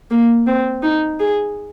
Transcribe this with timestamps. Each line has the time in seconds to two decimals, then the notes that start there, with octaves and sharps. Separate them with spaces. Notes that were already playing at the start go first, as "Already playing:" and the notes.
0.10 A#3
0.47 C4
0.83 D#4
1.20 G#4